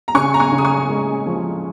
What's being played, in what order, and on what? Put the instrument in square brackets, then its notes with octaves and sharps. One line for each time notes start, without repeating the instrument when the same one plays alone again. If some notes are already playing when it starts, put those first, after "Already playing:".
[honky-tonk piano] A#5
[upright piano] C#3 [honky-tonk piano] G#5 C#6
[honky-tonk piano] A#5
G#5 C#6
[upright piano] C#3
[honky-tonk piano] D#6
G#5 C#6
[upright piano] G#3
F3